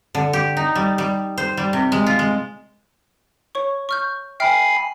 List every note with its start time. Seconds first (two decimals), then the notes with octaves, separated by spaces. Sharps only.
0.15 D3
0.33 G4
0.57 D#4
0.75 G3
0.98 G3
1.38 C5
1.57 G3
1.73 C3
1.92 G#3
2.06 F4
2.19 G#3
3.55 C#5 C#6
3.89 C#6 F6 G6
4.40 E5 G5 G#5 B5 F6 C7